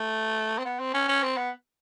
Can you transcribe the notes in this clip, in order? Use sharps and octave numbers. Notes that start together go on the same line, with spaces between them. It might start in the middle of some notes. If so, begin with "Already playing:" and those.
Already playing: A3
C4
B3
C4
C#4
C#4
C4
B3